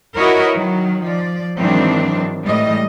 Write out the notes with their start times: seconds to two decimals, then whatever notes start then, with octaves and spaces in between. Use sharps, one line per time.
0.18 E4 F#4 A#4 B4 C#5 D#5
0.55 D#3 F#3
1.03 F3 D5
1.59 G#2 D#3 E3 F#3 C4 D4
2.44 A2 E3 G3 G#3 D#5